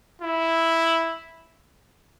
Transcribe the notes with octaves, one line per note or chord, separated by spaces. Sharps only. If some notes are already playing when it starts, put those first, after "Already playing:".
E4